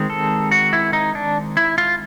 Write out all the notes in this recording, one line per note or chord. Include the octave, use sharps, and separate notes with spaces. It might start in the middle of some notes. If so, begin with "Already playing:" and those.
Already playing: D#3 G#3 C4
A4
F#4
E4
D#4
D4
E4
F4